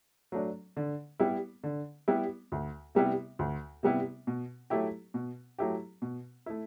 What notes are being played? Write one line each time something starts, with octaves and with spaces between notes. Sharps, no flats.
F#3 A3 D4
D3
G3 B3 E4
D3
G3 B3 E4
D2
C3 G3 B3 E4
D2
C3 G3 B3 E4
B2
F#3 A3 E4 G4
B2
F#3 A3 E4 G4
B2
A3 E4